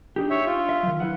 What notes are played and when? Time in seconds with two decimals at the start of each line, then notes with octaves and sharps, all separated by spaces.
0.16 D4 D#4 G4
0.30 C#5 E5
0.46 F4
0.69 E5
0.83 D#3 F#3
1.00 E4 B4 F#5